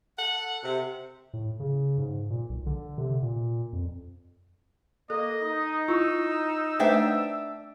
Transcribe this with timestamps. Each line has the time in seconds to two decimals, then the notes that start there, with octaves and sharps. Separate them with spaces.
0.18 A4 F#5
0.63 C3
1.33 A2
1.60 C#3
1.98 G#2
2.30 A#2
2.49 B1
2.66 D3
2.98 C3
3.22 A#2
3.73 F2
5.10 A#3 A4 D#5
5.42 D#4
5.88 E4 F4 E6
6.80 A3 D4 B4 C5 E5 G5